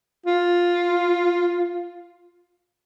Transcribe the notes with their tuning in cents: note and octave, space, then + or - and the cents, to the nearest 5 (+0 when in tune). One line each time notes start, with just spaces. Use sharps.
F4 +5